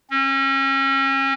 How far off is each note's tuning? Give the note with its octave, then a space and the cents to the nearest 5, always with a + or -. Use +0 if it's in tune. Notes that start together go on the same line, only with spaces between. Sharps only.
C#4 -35